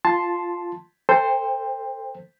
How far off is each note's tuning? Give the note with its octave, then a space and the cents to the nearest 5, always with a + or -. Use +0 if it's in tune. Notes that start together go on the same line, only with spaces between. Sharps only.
F4 +0 A5 +0 C6 +0
A4 +25 C5 +0 G5 +30